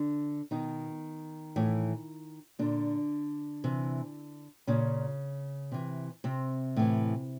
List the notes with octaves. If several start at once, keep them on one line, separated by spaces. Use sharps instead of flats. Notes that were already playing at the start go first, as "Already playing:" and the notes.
Already playing: D3 D4
B2 D#3 D#4
A2 E3
A#2 D3 D4
C3 E3
A#2 C#3 C#4
C3 E3
C3 C4
A2 E3